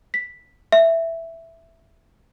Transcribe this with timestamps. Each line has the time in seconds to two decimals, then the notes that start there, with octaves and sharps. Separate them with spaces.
0.14 B6
0.72 E5